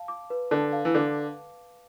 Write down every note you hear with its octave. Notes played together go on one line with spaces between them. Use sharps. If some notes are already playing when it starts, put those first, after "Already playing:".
Already playing: F5 A5
D6
B4
D3 A5
F5
E3
D3 D6